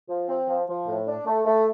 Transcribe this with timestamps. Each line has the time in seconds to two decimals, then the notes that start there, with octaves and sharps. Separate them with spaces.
0.09 F3
0.28 C4
0.48 F3
0.67 F3
0.87 A2
1.07 D4
1.26 A3
1.46 A3